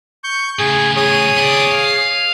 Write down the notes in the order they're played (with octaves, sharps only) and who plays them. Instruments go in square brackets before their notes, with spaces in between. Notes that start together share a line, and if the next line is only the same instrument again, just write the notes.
[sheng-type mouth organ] C#6 G6
[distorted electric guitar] A2 C#3 [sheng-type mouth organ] G#4
[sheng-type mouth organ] G#4 C#5 D#6
[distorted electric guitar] B3 D5
F5